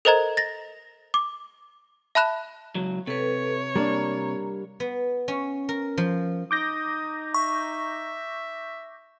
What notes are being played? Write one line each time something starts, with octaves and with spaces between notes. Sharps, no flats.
A4 A#4 C5 D#5 A#5 G#6
A6 A#6
D6
E5 A5 B5 F#6 E7
C#2 F#3
C3 A4 B4 C#5
G3 A#3 D4 A#5
B3
C#4
A#4
F3
D#4 D6 D#6 G6 A#6
E5 C#6